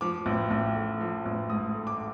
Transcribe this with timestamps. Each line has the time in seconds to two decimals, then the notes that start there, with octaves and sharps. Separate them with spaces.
0.01 F3 D6
0.26 A1
0.51 A1
0.75 A3
1.00 F3
1.26 A1
1.50 G#2 D#6
1.74 A3
1.87 D6